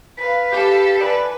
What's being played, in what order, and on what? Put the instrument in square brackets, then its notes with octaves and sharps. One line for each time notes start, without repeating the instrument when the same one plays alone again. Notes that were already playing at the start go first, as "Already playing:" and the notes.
[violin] B4 F5 [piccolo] B6
[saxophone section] G4 [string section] A4
[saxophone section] E3 D4 D5 [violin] B4